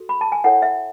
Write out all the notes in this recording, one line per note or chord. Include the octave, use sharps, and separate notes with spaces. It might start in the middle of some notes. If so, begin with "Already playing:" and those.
Already playing: F#4 A4
B5
A5
G#5
E4 A4 C#5 F#5
E5